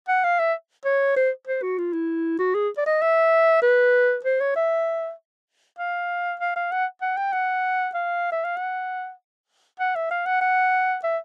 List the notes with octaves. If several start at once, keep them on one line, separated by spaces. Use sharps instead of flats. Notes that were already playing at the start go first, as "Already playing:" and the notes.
F#5
F5
E5
C#5
C5
C5
F#4
F4
E4
F#4
G#4
D5
D#5
E5
B4
C5
C#5
E5
F5
F5
F5
F#5
F#5
G5
F#5
F5
E5
F5
F#5
F#5
E5
F5
F#5
F#5
E5